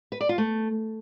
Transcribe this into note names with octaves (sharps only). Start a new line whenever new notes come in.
B4
D5
F4
A3